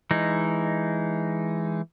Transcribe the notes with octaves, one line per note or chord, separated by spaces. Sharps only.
E3 G#3 D#4